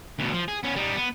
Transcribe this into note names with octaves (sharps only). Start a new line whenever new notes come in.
D2 B2
F3
G#4
B3 C#4
G3 D#4
B3